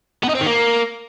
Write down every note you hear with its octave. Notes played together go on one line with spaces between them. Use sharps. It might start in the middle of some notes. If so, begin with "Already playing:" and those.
B3
D#4
C4
D#3
A#3